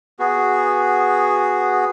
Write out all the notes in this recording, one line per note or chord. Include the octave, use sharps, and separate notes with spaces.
B3 F#4 G#4